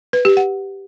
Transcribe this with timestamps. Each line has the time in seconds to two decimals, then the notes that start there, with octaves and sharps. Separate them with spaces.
0.13 B4
0.25 G4
0.37 F#5